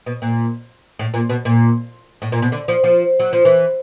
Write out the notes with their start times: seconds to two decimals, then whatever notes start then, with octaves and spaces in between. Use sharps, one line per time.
0.06 B2
0.22 A#2
0.99 A2
1.14 A#2
1.29 B2
1.45 A#2
2.22 A2
2.32 A#2
2.42 B2
2.52 D3
2.68 F3
2.84 F3
3.19 F#3
3.33 F3
3.45 E3